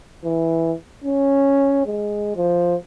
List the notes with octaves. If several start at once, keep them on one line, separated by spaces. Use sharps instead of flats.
E3
C#4
G#3
F3